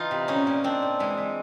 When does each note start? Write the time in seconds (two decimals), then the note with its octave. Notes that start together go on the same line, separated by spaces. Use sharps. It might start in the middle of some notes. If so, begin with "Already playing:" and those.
Already playing: E3 D#4 F4
0.11 C3
0.28 A#2 C#4 D#4
0.47 A#2
0.64 A#2 C4 D4
0.82 A#2
0.99 E3 G#3
1.17 E3